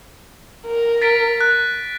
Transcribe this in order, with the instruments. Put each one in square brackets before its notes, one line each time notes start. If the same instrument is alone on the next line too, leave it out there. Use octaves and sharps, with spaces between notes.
[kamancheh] A#4
[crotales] A6 B6 D7
F#6